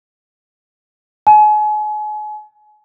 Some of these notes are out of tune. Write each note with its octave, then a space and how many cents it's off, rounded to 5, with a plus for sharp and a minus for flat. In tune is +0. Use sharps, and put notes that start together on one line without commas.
G#5 +35